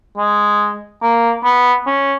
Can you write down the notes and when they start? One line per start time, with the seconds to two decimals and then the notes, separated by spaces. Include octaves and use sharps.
0.17 G#3
1.02 A#3
1.44 B3
1.86 C#4